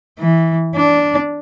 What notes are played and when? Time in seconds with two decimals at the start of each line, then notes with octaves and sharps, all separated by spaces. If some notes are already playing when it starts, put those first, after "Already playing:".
0.19 E3
0.75 D4